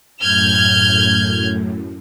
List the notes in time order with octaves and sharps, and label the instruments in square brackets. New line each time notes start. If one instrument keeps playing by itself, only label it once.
[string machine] F#2 A2 [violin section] F6 G6 G#6